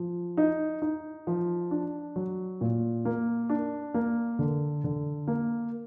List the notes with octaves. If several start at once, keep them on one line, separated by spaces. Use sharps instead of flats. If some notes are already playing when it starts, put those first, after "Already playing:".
Already playing: F3
D#4
D#4
F3
D4
F#3
A#2
A#3
D4
A#3
D3
D3
A#3